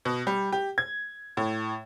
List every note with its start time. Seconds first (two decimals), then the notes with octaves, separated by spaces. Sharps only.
0.05 B2
0.27 G3
0.52 G4
0.78 G#6
1.37 A2